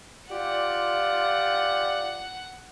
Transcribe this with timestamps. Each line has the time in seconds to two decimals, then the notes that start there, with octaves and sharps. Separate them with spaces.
0.31 F4 G4 D5 F#5